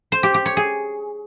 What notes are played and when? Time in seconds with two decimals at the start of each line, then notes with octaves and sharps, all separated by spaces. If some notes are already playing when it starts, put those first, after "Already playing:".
0.12 C5
0.23 G4
0.34 G4
0.46 C#5
0.57 G#4